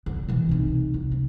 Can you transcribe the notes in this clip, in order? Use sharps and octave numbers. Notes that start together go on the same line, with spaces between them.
D3
B2 E3
C2 D#4
C2
C#3